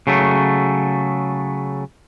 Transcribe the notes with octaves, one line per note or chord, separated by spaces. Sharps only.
C#3 F#3 A3